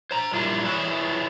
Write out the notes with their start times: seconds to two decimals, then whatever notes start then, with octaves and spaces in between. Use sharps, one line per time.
0.11 C5 A#5
0.33 A#2 G3 D4 E4 F4
0.65 E4 G#4 B4 C#5 D5 E5